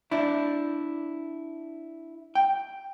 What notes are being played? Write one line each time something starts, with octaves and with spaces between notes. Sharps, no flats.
D4 E4
G5